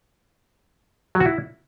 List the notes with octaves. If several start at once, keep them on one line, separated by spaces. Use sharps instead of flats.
F#3
F#4
E4